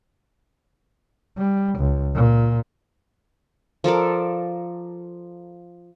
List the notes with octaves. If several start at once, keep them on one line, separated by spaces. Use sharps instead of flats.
G3
C#2
A#2
F3 A4 A#4 D5